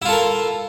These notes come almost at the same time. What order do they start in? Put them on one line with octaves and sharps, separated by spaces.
E4 F4 A4 A#4